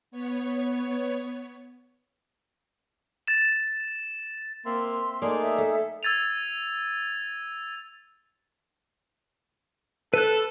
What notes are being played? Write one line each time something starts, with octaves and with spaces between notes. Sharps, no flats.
B3 C#5
A6 E7
A#3 C4 E5 C6
A3 A#3 D#4 G#4 D5
E5
A4
E6 G#6 A6 D#7 F7
A4 B4 F#6